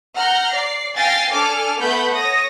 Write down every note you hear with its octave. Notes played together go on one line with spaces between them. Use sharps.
F#5 A#5 F6 G6
D5 C7
F5 G5 G#5 A6 A#6 C7
D4 A4 G#5 D6 F6
A3 B3 B4 F#5 B5 G6
C#5 D#6 A#6